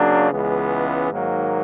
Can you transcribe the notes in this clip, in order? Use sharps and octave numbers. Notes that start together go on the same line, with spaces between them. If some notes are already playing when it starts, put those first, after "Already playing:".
Already playing: C#3 F#3 A#3 D4
C#2 C#3 E3 G#3 B3
G#2 D#3 F#3 A#3